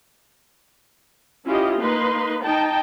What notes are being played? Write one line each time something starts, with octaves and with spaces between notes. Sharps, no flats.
C#4 E4 F4 G4 D#5
A#3 D#4 B4 C6
D#4 G5 A5